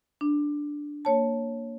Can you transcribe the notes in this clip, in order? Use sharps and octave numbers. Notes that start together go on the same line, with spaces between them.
D4
A#3 C#5 A5